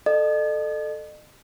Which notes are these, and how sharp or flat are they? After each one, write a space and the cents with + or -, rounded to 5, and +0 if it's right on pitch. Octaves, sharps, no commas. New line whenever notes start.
A4 +0 D#5 -45